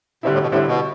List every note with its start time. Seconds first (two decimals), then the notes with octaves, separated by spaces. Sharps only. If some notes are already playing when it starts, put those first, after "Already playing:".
0.23 B2 D3 G3 C4 E4
0.34 A2
0.42 B2
0.52 A2 D3 G3 C4 E4
0.67 B2